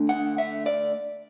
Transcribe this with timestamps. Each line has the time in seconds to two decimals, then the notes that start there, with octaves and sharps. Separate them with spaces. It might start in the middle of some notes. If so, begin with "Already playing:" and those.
Already playing: D3 A3 D4
0.09 F#5
0.38 E5
0.66 D5